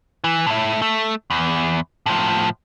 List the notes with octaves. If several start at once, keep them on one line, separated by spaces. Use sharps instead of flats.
E3
A2 E4
A3
E2
A2 F3